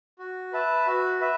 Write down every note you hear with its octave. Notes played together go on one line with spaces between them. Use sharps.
F#4
B4 E5 A5
F#4
B4 E5